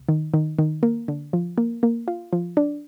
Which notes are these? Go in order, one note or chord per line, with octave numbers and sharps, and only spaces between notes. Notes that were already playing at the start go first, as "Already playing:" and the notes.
Already playing: C2
D#3
D#3
D#3
A#3
D3
F3
A#3
A#3
F4
F3
D4